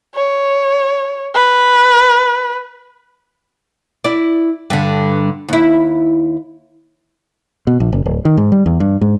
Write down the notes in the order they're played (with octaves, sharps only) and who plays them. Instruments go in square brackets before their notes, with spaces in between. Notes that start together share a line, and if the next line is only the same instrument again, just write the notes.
[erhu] C#5
B4
[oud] E4 D5
G2 D3
D#2 E4
[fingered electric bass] B2
A#1
F#1
D1
D#3
G#2
G3
E2
G2
G#2